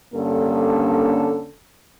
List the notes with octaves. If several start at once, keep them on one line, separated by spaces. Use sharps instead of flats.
G2 D3 A#3 C#4 A4